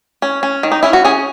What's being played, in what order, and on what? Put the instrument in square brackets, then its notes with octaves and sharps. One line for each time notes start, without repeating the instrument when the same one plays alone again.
[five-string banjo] C#4
C#4
D#3
D#4
C#4 E4
F#4
C#4 G#4